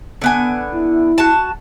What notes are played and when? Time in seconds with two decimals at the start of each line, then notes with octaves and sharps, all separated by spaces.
0.22 D3 B3 G#5
0.74 E4
1.18 F#4 A5